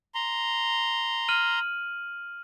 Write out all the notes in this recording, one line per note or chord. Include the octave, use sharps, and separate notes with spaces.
A#5 C6
F6 D#7 F#7